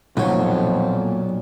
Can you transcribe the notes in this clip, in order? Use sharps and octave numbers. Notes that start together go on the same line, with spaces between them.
B1 F2 A#2 F#3 C#5